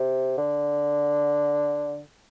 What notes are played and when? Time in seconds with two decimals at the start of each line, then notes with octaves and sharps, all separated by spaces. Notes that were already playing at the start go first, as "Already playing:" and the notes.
Already playing: C3
0.38 D3